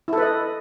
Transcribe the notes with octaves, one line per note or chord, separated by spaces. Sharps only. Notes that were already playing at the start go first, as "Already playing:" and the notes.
E4 A4 B4 D#5